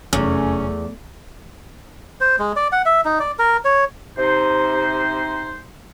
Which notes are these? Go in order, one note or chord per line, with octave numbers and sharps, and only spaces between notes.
F1 E2 F#3 A3 C#4
C5
G#3
D5
F#5
E5
D#4
D5
A#4
C#5
C3 D#4 C5